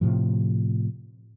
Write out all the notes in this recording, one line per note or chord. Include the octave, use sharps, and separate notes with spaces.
A2 C3 F3